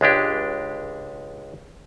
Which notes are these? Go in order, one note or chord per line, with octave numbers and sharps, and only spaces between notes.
C#2 G#3 D4 G4